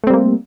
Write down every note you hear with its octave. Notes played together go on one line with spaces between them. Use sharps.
G3 A3 A#3 C4